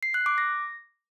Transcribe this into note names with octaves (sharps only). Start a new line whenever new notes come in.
C7
F#6
D6
A#6